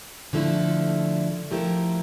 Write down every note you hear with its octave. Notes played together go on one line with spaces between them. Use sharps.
D3 F3 A3 E4 A4
F3 A3 E4 G4 A#4